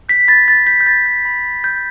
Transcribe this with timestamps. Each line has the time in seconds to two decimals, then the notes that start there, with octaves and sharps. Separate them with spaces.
0.09 G6 B6
0.28 B5 A6
0.48 B5 A6
0.67 G6 B6
0.80 G6
0.86 B5 A6
1.06 G6
1.25 B5
1.45 B5
1.64 G6